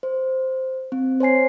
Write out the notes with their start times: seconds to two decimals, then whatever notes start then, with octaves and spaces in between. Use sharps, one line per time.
0.03 C5
0.92 C4
1.20 C5 C#5 G#5 C7